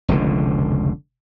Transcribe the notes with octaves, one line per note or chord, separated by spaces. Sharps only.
F1 C#2 B2 D3